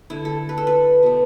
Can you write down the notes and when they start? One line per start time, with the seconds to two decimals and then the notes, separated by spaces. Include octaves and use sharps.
0.10 D3 A3 E4
0.25 A4
0.49 B4
0.58 A4
0.67 B4
1.03 B2 A3